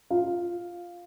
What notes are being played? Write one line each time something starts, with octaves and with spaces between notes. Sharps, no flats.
F4 F5